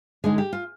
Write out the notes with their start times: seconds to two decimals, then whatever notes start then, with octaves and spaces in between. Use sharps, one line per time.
0.24 D3 G#3 D#4 G#4
0.38 G4
0.53 F4